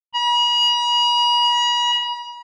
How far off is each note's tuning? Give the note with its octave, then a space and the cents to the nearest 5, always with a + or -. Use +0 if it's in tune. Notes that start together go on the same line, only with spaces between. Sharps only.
B5 -45